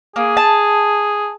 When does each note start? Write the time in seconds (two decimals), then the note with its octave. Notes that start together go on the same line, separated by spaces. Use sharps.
0.16 A#3 G#4
0.37 A5